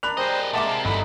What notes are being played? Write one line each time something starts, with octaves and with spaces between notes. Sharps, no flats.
D4 A#4 B5 F#6 F7
G3 D4 G#4 A#4 C5 D#5
A#2 G#3 A#4 E5 F#5 A5 D6
C4 G4 A#4
G1 G#2 E4 D#5 E5 A#5 B5